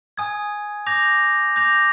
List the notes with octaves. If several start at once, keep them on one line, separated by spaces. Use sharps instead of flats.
G#5 D#6 G#6
D6 G6 A#6 F7
D6 G6 A#6 F7